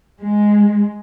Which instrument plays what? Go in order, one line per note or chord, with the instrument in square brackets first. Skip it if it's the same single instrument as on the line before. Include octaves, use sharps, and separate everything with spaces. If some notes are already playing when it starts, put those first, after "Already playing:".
[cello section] G#3